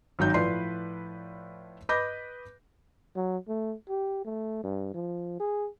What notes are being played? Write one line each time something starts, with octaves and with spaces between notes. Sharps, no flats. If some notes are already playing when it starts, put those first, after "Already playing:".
G#1 F#3 D#4 G6
A2 F3 B4 D5 C6 C7
B4 D#5 B5 D6 G6 A#6
F#3
A3
G4
A3
G2
F3
G#4